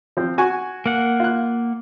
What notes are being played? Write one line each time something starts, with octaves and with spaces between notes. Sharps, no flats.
F3 C4
F#4 G#5 C#6
A#3 F#5
F4 F#6